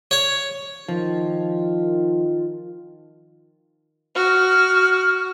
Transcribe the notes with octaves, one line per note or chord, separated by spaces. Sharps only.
C#5
D#3 F3 F4
F#4 F6